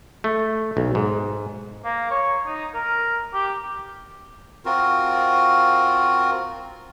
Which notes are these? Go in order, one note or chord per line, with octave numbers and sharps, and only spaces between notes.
A3
B1
G#2
A#3
C#5
D#4
A#4
G4
C4 F4 F#4 A#4